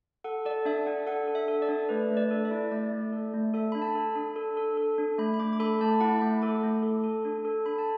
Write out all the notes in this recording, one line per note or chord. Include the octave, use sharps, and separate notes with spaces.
A4 F#5
A4 D5
D4 E5
D4 F#5
A4 F#5
A4
E5
A4
D5
D4
A3 B4
A3
D5
A4
E5
E4
A3 D5
A3
A4
A3
A4 E5
D4 B5
A5
A4
D4
A4
A4
A4
D4
A3 B5
B5
A3 D6
D6
A4 B5
A3 A5
E4 F#5
A3 B5
A4 D6
A3
A4
A4
D4
A4
D4 B5
A5